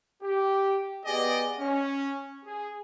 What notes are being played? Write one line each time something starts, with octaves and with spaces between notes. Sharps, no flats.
G4
B3 G4 G#4 D5 D#5
C#4
G#4